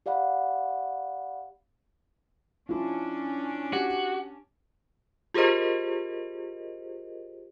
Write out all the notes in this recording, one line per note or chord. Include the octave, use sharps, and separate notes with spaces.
G4 D5 F5 F#5 B5
F3 C#4 D4 E4
F#4 G4
F4 G4 G#4 A#4 C5 D#5